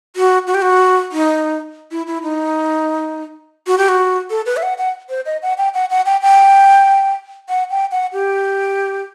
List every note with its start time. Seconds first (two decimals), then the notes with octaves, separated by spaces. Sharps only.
0.16 F#4
0.47 F#4
0.54 G4
0.62 F#4
1.12 D#4
1.91 E4
2.07 E4
2.23 D#4
3.67 F#4
3.78 G4
3.88 F#4
4.30 A4
4.46 B4
4.57 E5
4.63 F#5
4.78 F#5
5.10 C5
5.26 D#5
5.42 F#5
5.58 G5
5.74 F#5
5.90 F#5
6.06 G5
6.21 G5
7.49 F#5
7.70 G5
7.92 F#5
8.13 G4